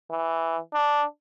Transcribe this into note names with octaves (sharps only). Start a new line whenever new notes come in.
E3
D4